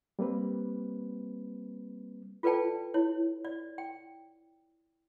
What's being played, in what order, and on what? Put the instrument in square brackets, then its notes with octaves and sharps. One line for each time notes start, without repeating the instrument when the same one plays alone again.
[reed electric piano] G3 A#3 C4 B4
[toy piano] F4 A4 B4 D5 G5 A5
E4 C#5
D5
G5